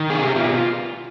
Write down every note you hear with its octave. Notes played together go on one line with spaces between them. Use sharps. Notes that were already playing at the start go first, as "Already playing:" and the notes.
Already playing: D#3
C3 G#4
G4
B2 F4